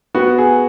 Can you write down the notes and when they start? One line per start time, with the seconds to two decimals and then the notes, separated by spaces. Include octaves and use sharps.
0.14 B3 F#4
0.38 G#4